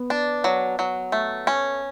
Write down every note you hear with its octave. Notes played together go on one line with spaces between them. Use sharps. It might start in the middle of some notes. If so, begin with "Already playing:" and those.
Already playing: B3
D4
F#3
F#3
A3
C#4